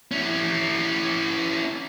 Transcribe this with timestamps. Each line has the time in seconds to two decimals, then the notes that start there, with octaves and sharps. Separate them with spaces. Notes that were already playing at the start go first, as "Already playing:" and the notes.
0.11 C#4 E4